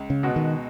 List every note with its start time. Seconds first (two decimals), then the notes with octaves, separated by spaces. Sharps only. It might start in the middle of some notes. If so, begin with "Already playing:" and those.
Already playing: C#2
0.10 C#3
0.23 B2 G#3 B3 F#4
0.36 D#3